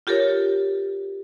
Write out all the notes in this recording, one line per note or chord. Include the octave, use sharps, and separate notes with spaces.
F4 G4 A4 A#4 C#5